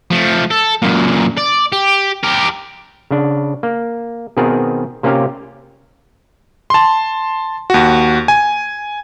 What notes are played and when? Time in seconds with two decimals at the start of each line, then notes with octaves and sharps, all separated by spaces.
0.11 F3 A3
0.51 A4
0.82 F#2 A#2
1.38 D5
1.72 G4
2.23 G4 A#4
3.11 C#3 D4
3.63 A#3
4.37 B2 D#3 B3 C4 G#4 A#4
5.03 C3 A#3 C#4 F4 G4 F5
6.70 A5 C6
7.70 D#2 F#4
8.28 G#5